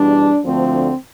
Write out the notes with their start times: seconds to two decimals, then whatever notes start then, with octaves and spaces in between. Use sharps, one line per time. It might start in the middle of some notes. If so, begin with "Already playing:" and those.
Already playing: E2 B2 G3 D4
0.43 D2 D3 F3 A3 C4